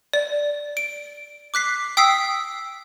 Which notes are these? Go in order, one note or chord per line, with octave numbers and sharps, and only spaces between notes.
D5
D7
D6 F#6 B6 C7
G5 D#6 E6 B6 C7